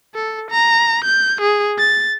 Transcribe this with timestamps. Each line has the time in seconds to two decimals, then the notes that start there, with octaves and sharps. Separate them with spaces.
0.15 A4
0.51 A#5
1.05 G6
1.41 G#4
1.78 A6